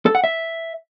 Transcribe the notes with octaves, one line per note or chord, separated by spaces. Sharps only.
A4
F#5
E5